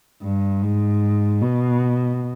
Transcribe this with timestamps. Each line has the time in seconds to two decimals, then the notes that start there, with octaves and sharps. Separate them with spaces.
0.22 G2
0.62 G#2
1.41 B2